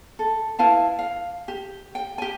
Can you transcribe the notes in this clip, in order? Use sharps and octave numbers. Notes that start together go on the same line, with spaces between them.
A4
E4 B4 F5 A5
F5
G4
G5
G4 G#5